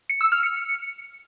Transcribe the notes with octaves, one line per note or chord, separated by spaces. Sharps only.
C#7
E6
F6
C#7